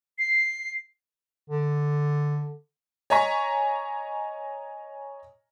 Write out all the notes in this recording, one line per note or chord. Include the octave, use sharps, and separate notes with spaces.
C7
D3
C#5 D#5 G#5 A#5 C#6 B6